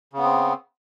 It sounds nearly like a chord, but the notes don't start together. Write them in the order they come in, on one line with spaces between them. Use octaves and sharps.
C#3 B3 C4